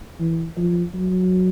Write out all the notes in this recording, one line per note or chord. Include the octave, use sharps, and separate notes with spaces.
E3
F3
F#3